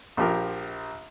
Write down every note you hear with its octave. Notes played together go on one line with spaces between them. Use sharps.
A#1 F3 G4 A#4